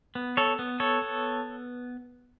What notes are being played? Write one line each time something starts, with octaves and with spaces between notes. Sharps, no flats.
B3
A4 C#5
B3
A4 C#5
B3